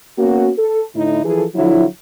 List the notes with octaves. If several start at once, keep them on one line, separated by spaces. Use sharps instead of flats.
A#3 B3 C#4 F#4
A4
A2 D3 D#4 E4
E3 F3 G#4 A4
D3 F3 F#3 E4